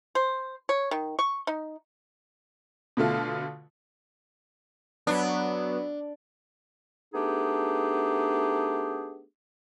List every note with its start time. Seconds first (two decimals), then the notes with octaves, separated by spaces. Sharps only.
0.15 C5
0.69 C#5
0.91 D#3
1.19 C#6
1.47 D#4
2.97 B2 D3 A3 F4
5.07 F#3 B3 D4
7.14 A3 B3 D4 D#4 G4 G#4